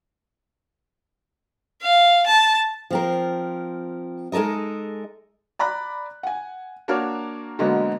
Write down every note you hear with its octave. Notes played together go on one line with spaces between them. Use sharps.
F5
A5
F3 C4 A#4
G#3 D#4 A4 A#4 D#5
D5 A#5 B5 F#6
F#5 G#5
A#3 D4 F#4 A#4 C#5
B2 D3 F#3 G#3 A#3 B3